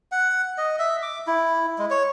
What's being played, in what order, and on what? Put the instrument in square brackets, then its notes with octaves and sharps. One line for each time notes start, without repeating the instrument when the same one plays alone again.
[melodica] F#5
D#5
E5
D6
E4
G#3
C#5